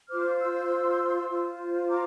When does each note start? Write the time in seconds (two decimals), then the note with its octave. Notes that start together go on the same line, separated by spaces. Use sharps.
0.10 F4 C5 D6 F6
0.40 C6 E6
1.30 F4 C5
1.88 A#5 D6